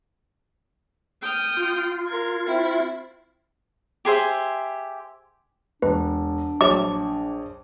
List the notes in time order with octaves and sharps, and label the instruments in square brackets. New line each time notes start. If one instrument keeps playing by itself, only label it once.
[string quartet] G5 D#6 F6
[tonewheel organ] F4
[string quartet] A#4 G#6
C4 E4
[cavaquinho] G4 G#4 C5 E5
[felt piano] E1 [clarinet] D4 [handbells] B4
[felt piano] A#1 C#5 [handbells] F#4 [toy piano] D6